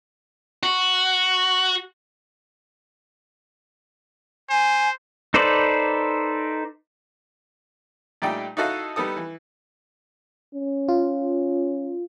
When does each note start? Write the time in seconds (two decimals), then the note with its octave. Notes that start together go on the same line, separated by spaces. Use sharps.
0.63 F#4
4.50 C5 G#5
5.34 D#4 A4 B4 C5 D5
8.22 A#2 G3 A3 D#4 D5 G5
8.57 D#4 E4 F#4 A4 D#5 F5
8.96 G3 B3 D#4 A4 D#6
9.17 E3
10.55 C#4
10.88 F4